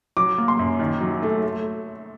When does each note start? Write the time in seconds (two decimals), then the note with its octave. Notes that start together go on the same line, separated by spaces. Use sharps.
0.17 F#3 D6
0.38 A#3
0.48 C6
0.59 F#2
0.80 D#3
1.01 F#3
1.23 A3
1.43 A3